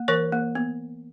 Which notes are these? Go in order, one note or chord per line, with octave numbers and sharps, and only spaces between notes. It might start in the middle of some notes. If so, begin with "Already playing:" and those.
Already playing: A#3
E3 A#4 C#5
A#3
B3